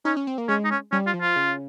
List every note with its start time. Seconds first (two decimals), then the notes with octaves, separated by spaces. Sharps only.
0.05 C#4 D#4
0.17 C#4
0.27 C4
0.38 A#3
0.49 G#3 C#4
0.65 D#4
0.71 C#4
0.92 G3 C#4
1.07 F4
1.14 F3
1.21 F4
1.36 C#3